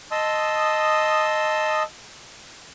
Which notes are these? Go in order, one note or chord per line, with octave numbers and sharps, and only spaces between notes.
D#5 A5 C6 D#6 E6